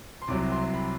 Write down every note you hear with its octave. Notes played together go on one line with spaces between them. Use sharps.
C6
C2 C3 F#3 D6
C6
B5